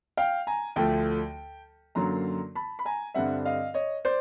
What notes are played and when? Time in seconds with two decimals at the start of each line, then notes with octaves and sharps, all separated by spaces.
0.17 F5 G5
0.47 G#5 A#5
0.76 D2 D3 F3 A3 G5 A5
1.95 F#2 D3 F#3 A#3 A#5 C6
2.55 A5 B5
2.79 B5
2.85 G#5 A#5
3.14 G2 D3 G3 C4 E5 F#5
3.45 D#5 F5
3.74 C#5 D#5
4.05 C5 D5